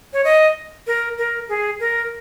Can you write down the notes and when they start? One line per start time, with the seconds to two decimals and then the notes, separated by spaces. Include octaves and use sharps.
0.13 C#5
0.24 D#5
0.87 A#4
1.18 A#4
1.49 G#4
1.80 A#4